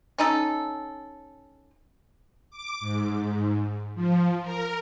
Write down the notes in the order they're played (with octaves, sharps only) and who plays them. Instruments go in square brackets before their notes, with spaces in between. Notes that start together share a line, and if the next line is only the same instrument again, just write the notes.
[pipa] C#4 D#4 A4
[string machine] D6
G#2
F3
A#4